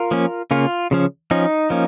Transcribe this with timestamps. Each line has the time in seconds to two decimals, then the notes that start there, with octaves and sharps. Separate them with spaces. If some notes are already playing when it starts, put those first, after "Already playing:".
Already playing: F4 A#4
0.11 F3 A#3 C#4
0.51 C#3 A#3 C#4 F4
0.91 C#3 F3 C#4
1.31 F3 C#4 D#4
1.70 F3 A#3 C#4